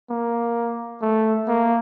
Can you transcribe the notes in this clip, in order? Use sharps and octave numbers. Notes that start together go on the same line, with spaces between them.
A#3
A3
A#3